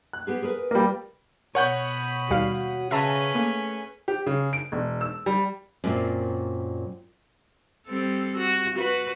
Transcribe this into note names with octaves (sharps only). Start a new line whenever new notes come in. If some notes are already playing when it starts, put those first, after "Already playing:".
F#6
B3 G4 G#4
G#4 A#4 B4
G3 A#3
B2 C#5 F#5 B5 D#6 G6
D#2 G3 F#4 F5
C#3 C#4 G#4 B4 E5 A5 A#5
A3 A#3
G4
C#3
D7
E1
E6
G3
F#2 A#2 C4
G3 C4 A4
F#4
F#4 B4